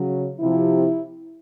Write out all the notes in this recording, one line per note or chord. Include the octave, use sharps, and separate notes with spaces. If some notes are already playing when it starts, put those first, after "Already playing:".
Already playing: C#3 F#3
C3 F3 E4